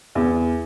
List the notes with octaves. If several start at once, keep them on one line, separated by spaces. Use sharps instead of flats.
E2